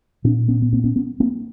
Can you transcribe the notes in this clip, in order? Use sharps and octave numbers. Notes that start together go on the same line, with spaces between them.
A#2 C4 D4
B3 C#4
B3
A#3 C4
B3 C#4
B3 C#4
A#3 C4